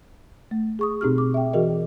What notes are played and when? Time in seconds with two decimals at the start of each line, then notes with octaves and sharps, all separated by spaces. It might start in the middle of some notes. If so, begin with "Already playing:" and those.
0.51 A3
0.79 G#4 C#6 D#6
1.01 B2 C4 D#4 G4 G#4 F6
1.18 D6
1.34 E5 G5
1.53 E3 F#4 G#4 A#4 D#5